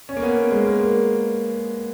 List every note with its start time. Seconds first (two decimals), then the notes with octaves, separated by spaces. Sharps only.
0.09 C#4
0.17 A#3
0.23 B3
0.51 G#3
0.64 A#3
0.79 A#3